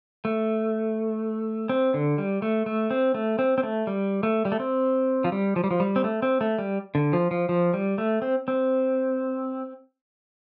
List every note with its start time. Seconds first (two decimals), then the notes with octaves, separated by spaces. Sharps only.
0.25 A3
1.69 C4
1.94 D3
2.18 G3
2.42 A3
2.66 A3
2.91 C4
3.15 A3
3.39 C4
3.58 C4
3.63 A3
3.87 G3
4.23 A3
4.45 G3
4.52 A3
4.60 C4
5.24 F3
5.32 G3
5.56 F3
5.64 G3
5.71 F3
5.80 G3
5.96 C4
6.04 A3
6.22 C4
6.41 A3
6.59 G3
6.95 D3
7.13 F3
7.31 F3
7.49 F3
7.74 G3
7.98 A3
8.22 C4
8.48 C4